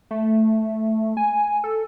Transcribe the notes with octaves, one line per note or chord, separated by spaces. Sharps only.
A3
G#5
A4